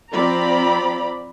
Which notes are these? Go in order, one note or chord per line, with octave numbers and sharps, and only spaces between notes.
F3 C4 D5 A#5 B5